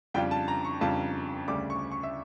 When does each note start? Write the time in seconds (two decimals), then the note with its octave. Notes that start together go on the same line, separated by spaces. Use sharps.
0.14 F2 C#3 G3 D4 F4 G5
0.31 A5
0.48 A#5
0.65 C#6
0.81 F2 C#3 G3 D4 F4 A5
1.48 D2 C#3 G3 D4 D6
1.70 C#6
1.92 C#6
2.03 E5